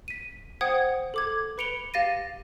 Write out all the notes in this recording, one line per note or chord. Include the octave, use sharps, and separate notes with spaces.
B6 D#7
C5 F#5 G5 D#6 G#6
A4 D6 G#6
B4 B5 C#7 D7 F7 G7
G4 F5 A6 A#6 D#7